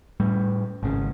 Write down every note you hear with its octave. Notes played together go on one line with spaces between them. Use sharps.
A2 G3 A3
G#1 C#3